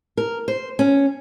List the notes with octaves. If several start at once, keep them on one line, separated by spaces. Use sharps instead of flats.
A#4
C5
C#4